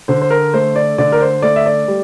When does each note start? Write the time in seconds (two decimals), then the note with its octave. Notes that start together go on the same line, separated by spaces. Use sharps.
0.08 D3 C5
0.22 C5
0.30 A#4
0.54 A3 C5
0.76 D5
0.98 D3 D5
1.12 A#4
1.21 C5
1.42 A3 D5
1.56 E5
1.66 D5
1.88 G3